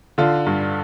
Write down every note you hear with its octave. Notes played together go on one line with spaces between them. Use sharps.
D3 F4
G2